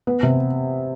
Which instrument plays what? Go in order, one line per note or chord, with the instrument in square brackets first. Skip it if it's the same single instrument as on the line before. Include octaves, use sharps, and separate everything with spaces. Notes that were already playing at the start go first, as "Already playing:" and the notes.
[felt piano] B3
C3